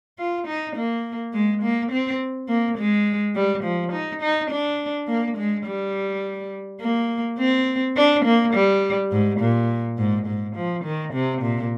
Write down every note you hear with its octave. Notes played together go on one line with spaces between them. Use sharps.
F4
D#4
A#3
G#3
A#3
C4
A#3
G#3
G3
F3
D#4
D#4
D4
A#3
G#3
G3
A#3
C4
D4
A#3
G3
G#2
A#2
G#2
G#2
F3
D#3
C3
A#2